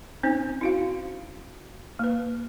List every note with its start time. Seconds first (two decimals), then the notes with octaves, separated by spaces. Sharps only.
0.23 C4 C#4 D#4 C5
0.61 E4 F#4 F5
1.99 A#3 B4